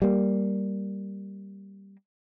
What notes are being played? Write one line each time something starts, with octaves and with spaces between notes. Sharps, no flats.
G3 A#3